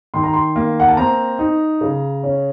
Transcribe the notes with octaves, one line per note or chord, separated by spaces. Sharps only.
D#3 C6
A#5
C6
A#3
F#5
A5
C4 A#5
D#4
C#3
C#4